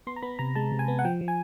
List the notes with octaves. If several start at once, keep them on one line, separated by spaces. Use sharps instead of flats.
B3 C6
A#5
B3 B5
C3 A#5
G#3 A5
C3
G#5
B3
F#5
F3 G5
F3
G#5